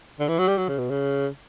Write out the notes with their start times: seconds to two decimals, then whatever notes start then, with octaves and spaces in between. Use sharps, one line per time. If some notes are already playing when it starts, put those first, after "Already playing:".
0.20 D3
0.29 E3
0.39 F#3
0.48 G3
0.58 F#3
0.69 C#3
0.78 B2
0.89 C#3